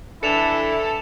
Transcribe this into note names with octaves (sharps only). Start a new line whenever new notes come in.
E3 D4 E4 A4 C#7 E7 F7